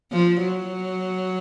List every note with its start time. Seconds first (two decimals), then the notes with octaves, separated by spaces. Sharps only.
0.12 F3
0.42 F#3